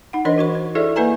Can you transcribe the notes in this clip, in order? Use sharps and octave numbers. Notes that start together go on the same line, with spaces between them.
D#4 F#5
E3 D4 A#4 C5 C#5 D#5
F#4 C5 C#6
C5
E4 G#4 A4 C5 D5 E5
A#3 E4 B4 E5 G#5 A#5